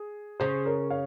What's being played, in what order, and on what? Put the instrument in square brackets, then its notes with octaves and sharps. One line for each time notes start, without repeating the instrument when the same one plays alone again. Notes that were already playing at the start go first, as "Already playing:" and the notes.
Already playing: [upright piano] G#4
[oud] C#3 [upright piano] G#4 C5
[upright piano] A#4 C#5
C#5 F5